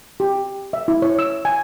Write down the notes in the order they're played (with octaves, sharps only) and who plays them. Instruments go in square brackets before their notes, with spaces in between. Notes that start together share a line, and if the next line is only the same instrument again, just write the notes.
[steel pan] G4
E5
E4
C#5
E6
G#5